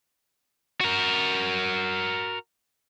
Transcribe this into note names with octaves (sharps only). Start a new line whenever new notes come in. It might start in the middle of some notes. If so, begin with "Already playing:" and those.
F#4 A#4